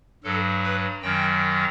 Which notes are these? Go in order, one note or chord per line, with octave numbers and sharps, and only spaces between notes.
G2 F#3 A4
B4
F#2 D#3 F#3 G5